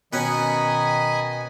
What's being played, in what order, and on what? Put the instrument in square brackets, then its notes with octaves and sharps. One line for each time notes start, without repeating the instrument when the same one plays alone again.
[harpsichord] B2 B3 C#4 [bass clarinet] D#3 [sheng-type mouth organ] D#5 G#5 B5